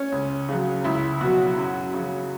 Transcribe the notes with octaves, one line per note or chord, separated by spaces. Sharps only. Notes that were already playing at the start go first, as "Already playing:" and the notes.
Already playing: C#4
C#2
C#3 F#3
C#2 E4
B2 F#3 F#4
F#2
C#3 F#3